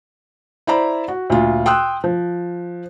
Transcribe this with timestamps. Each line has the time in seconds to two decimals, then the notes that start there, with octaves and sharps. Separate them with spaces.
0.67 E4 C5 D5 A#5 B5
1.08 F#4
1.30 D2 A#2 F4
1.66 G5 C6 D#6 E6 F#6
2.04 F3